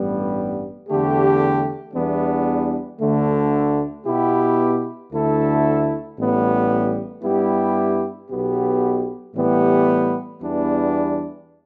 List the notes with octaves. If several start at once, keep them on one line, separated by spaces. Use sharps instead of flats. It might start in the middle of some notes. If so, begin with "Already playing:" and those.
Already playing: A1 G2 G3 B3
E2 D3 A3 G4
E2 E3 G3 B3 D4
D2 D3 A3
B2 B3 E4 G4
D2 D3 A3 E4 A4
A1 A2 G3 B3
G2 G3 B3 E4 G4
B1 B2 B3 G4
A2 E3 G3 B3 G4
E2 E3 G3 B3 D4